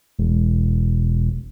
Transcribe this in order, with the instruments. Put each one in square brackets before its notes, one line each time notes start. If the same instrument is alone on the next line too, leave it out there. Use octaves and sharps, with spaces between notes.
[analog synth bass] E1